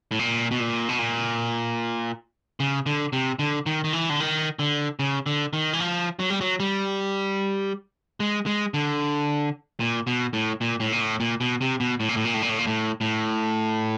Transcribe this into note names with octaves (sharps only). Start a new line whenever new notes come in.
A2
A#2
B2
A#2
B2
A#2
C#3
D3
C3
D3
D#3
D#3
E3
D3
D#3
D3
C#3
D3
D#3
E3
F3
F#3
G3
F#3
G3
G#3
G#3
D3
A#2
B2
A2
A#2
A2
A#2
A2
A#2
B2
C3
B2
A2
A#2
A2
A#2
A2
A#2
A2
A#2
A2
A2